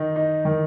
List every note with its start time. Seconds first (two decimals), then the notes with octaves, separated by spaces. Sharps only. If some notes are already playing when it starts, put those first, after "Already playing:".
Already playing: D#3 D#4
0.16 D#4
0.45 D#3